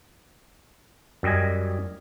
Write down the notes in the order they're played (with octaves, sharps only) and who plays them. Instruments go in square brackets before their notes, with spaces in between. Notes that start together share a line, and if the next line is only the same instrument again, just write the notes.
[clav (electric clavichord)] F#2 G3 D#5 G#5